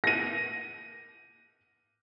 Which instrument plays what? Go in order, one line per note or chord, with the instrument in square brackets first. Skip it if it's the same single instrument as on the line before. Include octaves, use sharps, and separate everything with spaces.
[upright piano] A#6 D#7